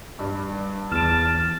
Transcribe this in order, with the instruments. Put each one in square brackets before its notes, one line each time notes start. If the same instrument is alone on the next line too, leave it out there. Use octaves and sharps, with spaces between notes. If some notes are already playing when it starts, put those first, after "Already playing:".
[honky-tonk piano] G2
[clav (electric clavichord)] E2 [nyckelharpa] A5 [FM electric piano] F6 [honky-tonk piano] D7 E7